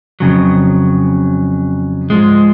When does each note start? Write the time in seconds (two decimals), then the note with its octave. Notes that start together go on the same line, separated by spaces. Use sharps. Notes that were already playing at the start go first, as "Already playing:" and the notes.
0.20 F2 C#3 F#3
2.10 G#2 F3 G#3